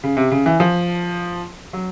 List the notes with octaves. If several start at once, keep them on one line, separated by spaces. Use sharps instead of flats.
C#3
C3
C#3
E3
F3
F#3